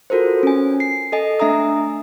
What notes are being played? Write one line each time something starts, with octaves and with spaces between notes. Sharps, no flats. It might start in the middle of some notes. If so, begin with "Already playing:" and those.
F4 F#4 A4 A#4 C5
C#4 G#5
C7
A4 D#5 G#5
A3 D4 E5 G#5 A#5 D#6